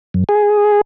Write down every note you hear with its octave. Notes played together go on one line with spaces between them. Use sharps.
F#2
G#4